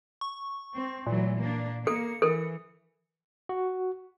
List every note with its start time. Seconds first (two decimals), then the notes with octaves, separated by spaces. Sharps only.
0.21 C#6
0.73 C4
1.07 A#2 E3 F#3 A3
1.36 A#3 D4
1.87 A#3 A4 C#7
2.22 E3 A4 A#4
3.49 F#4